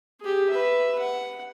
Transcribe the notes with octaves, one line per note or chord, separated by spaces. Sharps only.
G4 G#4
B4 E5
F#5